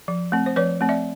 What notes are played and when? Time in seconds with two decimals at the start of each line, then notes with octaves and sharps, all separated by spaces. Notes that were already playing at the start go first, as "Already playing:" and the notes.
0.08 F3
0.32 A3 C4
0.46 C5
0.56 F3 B4 C#5
0.81 A3 C4
0.89 D5 E5